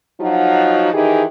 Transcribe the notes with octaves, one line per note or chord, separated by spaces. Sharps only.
F3 F#3 D#4 F4 F#4
D#3 E3 D#4 G4 G#4